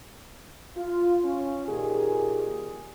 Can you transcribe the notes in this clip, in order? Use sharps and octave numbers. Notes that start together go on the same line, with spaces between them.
F4
C#4
A#2 D#3 G4 G#4